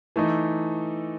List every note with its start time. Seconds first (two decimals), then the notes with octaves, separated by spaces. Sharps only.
0.16 E3 A3 D#4